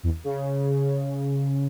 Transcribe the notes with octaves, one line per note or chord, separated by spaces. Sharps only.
E2
C#3